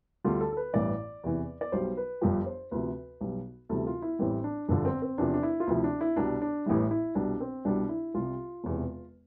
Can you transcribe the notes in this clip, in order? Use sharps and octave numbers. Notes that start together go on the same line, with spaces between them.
D2 D3 G3 F4
A4
A4
B4
A1 G2 E3 D5
E2 C3 E3
D5
B1 B2 G3 C5
B4
G1 G2 F3 G4
C5
D2 C3 F3 B4
B1 B2 G3
D2 C3 E3 G3 A4
F4
E4
A1 A2 E3 G3 C4
D4
G1 G2 D3 F3 D4
C4
C4
E2 C3 F3 D4
D4
E4
F4
D2 C3 F3 E4
D4
E4
C2 B2 G3 D4
D4
A1 A2 E3 G3 E4
E4
C2 B2 G3 D4
C4
C2 B2 G3 D4
E4
C2 C3 G3 F4
E1 E2 C3